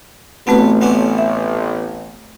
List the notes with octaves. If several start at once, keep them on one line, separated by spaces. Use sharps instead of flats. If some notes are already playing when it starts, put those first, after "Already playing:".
A1 A3 B3 C4 F#4 B4
B3 C#4 D4
E5